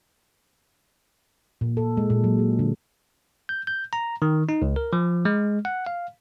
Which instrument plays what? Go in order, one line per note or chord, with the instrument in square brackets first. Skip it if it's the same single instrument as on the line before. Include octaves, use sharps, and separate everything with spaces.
[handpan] A#2
A4
G#3
A#2
F#3
G#4
D3
[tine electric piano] G6
G6
A#5
D#3
D#4
C#2
A#4
F3
G#3
F#5
F5